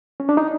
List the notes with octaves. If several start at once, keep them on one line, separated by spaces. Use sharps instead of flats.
C#4
D4
D#4